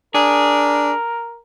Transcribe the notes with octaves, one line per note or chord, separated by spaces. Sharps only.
D4 G#4 A#4